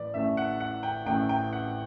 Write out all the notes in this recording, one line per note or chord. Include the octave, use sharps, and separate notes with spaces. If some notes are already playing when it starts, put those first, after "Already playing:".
Already playing: A2 E3 B4 D5
A1 A2 E3 A3 E5
F#5
F#5
G5
A1 A2 E3 A3 G5
G5
F#5